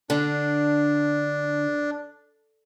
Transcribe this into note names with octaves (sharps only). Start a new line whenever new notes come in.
D3 D4